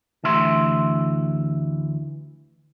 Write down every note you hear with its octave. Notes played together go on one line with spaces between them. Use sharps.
D2 E3 E5 C6